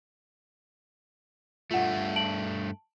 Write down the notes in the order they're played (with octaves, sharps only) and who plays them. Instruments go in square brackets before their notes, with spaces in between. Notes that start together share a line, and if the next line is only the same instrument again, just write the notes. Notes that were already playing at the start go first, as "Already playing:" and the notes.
[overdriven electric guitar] G2 A3 [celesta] F4 F#5
[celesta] A5 D7 F#7